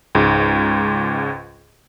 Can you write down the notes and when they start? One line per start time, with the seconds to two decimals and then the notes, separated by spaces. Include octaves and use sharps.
0.15 C#2 G#2